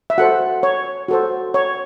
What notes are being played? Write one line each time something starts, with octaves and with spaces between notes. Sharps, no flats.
E5
F#4 A4 C5 F#5
C#5
F#4 A4 C5
C#5